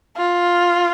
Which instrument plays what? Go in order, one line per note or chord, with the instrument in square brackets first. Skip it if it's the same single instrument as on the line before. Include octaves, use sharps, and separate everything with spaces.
[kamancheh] F4